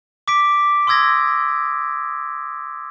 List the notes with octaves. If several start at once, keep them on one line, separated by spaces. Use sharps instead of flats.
D6 B6 D7
C6 D#6 E6 G#6 A#6